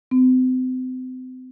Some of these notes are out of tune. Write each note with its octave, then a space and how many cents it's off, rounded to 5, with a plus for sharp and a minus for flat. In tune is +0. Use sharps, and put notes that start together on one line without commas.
C4 -35